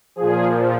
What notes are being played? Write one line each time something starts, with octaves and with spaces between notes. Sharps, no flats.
A#2 F3 G#4